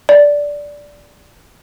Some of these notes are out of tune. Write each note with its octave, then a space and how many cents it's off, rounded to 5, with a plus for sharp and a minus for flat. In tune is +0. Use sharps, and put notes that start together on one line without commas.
D5 -10